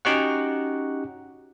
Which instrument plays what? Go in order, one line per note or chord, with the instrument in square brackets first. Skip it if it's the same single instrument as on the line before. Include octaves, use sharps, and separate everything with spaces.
[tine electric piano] C#4 D#4 F#4 G4 C#5 F#5